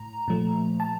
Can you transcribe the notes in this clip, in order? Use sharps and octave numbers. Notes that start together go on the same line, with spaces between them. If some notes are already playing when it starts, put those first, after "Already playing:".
Already playing: A2 A#5
A#2 F3 A3
A5